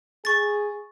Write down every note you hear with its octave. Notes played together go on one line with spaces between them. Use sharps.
G#4 C#6 A6